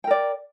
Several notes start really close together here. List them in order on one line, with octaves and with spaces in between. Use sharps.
G5 A#4 D5